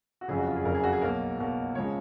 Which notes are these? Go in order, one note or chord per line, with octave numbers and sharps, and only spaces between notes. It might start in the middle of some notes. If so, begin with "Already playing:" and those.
F#4
F#1 F2 C#3 G#4
F#4
F4
G#4
F#1 F2 C#3 A#4
G#4
F#4
G#4
B1 B2 A#3 A#4
B1 B2 A#3
C#2 C#3 F3 G#3 C#5